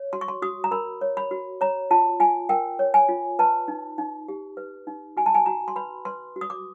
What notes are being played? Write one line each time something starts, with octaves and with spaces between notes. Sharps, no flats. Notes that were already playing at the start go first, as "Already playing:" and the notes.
Already playing: C#5
F#4 C6
C#6
C6
F#4 D#6
A#5
A#4 B5
C#5
B5
F#4
C#5 A#5
F4 A5
F4 G#5
A#4 G5
C#5
G#5
F4
B4 A5
D#4
D#4
G4
B4
D#4
F#4 G#5
A5
G#5
F#4 A#5
C6
B4 B5
B4 C6
F#4
D#6
D6